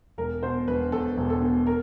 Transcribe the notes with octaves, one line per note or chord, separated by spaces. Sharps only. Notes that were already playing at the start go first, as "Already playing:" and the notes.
E1 A#4
B2 C5
E1 B4
E2 A4
E1
A4
B2
A#4